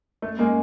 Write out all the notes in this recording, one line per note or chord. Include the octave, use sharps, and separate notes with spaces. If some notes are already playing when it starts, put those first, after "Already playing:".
A3
G#3 A#3